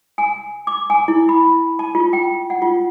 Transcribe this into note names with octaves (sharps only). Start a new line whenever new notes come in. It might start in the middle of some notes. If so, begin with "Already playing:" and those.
G#5
D6
G#5
E4
B5
A5
F4
G5
F#5
F4